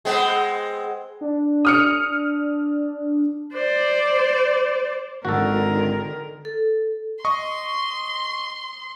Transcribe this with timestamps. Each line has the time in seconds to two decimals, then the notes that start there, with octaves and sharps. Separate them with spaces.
0.05 G#3 B3 C4
1.21 D4
1.65 D#6 F6 C#7
3.54 C5 D5
5.25 G#1 D3 D#3 F#4 A4 A#4
6.45 A4
7.25 D#5 C6 C#6 D#6